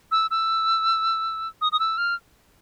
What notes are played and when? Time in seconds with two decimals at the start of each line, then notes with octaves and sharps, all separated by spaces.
0.11 E6
0.31 E6
1.61 D#6
1.72 D#6
1.80 E6
1.98 F6